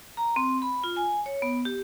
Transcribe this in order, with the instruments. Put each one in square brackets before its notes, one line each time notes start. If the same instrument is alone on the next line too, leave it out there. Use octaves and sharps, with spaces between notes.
[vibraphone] A#5
C4
B5
F4
G#5
C#5
B3
G4